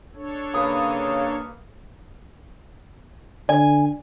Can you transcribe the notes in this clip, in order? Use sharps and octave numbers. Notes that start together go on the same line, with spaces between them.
D4 A4 C#5
C#3 A#3 B4 F5 D#6
D3 D5 G#5